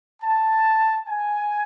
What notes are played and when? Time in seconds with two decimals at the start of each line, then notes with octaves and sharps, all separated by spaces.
0.22 A5
1.08 G#5